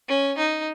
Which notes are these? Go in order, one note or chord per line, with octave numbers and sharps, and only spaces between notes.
C#4
D#4